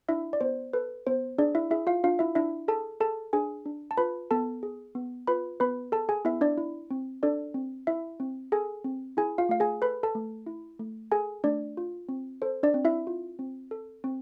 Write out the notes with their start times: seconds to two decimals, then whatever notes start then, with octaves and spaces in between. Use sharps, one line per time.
0.09 D4 E4 E5
0.33 D5
0.41 B3 C5
0.73 A4 B4
1.07 B3 C5
1.38 D4 G#4 D5
1.55 E4 E5
1.71 E4 G#4 E5
1.87 F4 F5
2.04 D4 F4 F5
2.19 E4 E5
2.35 D4 E4 E5
2.68 G#4 A4 A5
3.00 G#4 A4 A5
3.33 D4 G#4 G#5
3.66 D4
3.91 A5
3.97 F4 B4 B5
4.31 B3 A4 A5
4.63 G#4
4.95 B3
5.27 F4 B4 B5
5.60 B3 B4 B5
5.92 G#4 A4 A5
6.09 G#4 G#5
6.25 B3 E4 E5
6.41 D4 D5
6.58 E4
6.91 C4
7.23 D4 A4 D5
7.54 C4
7.87 E4 E5
8.20 C4
8.52 G#4 A4 G#5
8.84 C4
9.17 E4 G#4 G#5
9.38 F4 F5
9.49 A3 F5
9.60 G#4 G#5
9.82 A4 B4 B5
10.03 A4 A5
10.15 A3
10.47 E4
10.79 A3
11.12 G#4 A4 G#5
11.44 A3 D4 D5
11.77 F4
12.09 C4
12.42 A4 C5
12.63 D4 D5
12.74 C4
12.85 E4 E5
13.07 F4
13.39 C4
13.71 A4
14.04 C4